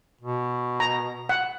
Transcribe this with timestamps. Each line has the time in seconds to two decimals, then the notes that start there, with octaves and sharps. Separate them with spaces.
0.21 B2
0.80 A#5
1.29 F#5